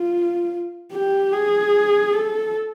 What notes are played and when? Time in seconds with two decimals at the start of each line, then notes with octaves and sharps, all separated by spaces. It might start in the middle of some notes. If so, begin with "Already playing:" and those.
Already playing: F4
0.93 G4
1.33 G#4
2.13 A4